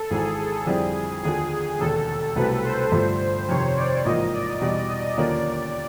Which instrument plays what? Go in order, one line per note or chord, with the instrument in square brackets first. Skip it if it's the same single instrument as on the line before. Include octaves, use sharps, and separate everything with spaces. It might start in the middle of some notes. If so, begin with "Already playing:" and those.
Already playing: [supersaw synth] A4
[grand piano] G#1 G#2 E3 [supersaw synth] G#4
[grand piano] F2 D3 G3 C4 E4
[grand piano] D#2 D3 F3 [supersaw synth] G#4
[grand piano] E1 D#2 D3 [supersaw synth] A4
[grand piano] C2 B2 F#3 A3 C4 [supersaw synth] B4
[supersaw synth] C5
[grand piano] G2 D3 F3 A3
[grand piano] F2 C3 D#3 [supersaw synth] C#5
[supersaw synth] D5
[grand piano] A1 G#2 F3 A#3 [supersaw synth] D#5
[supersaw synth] D5
[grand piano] E2 B2 G3 [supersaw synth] D5
[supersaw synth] D#5
[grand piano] D#2 D3 F3 A#3 C#4 [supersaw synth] D5